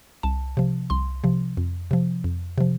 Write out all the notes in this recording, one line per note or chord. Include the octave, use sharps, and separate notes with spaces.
C2 A5
C3 F3
C2 C6
C3 F3
F2
C3 F3
F2
C3 F3